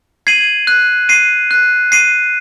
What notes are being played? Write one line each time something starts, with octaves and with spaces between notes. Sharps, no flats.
G#6 C7 D#7 F#7
F#6
C7 D#7
F#6
C7 D#7